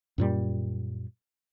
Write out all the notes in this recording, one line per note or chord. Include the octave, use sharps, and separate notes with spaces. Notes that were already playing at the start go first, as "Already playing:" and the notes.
F#2 A#2 G3